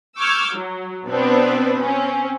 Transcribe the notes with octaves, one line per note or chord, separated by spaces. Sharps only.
C#6 D6 E6 F6 G6 G#6
F#3
B2 B3 C4 D4 B4
C4 C#4